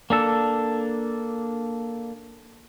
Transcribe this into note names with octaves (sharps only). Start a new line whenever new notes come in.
A#3 D4 A4